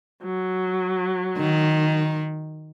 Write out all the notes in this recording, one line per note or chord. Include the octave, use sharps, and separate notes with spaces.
F#3
D#3